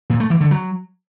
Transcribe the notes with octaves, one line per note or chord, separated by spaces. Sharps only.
A#2
A3
E3
D3
F#3